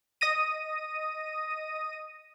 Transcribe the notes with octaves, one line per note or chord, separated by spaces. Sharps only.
D#5 D#6 A#6 D#7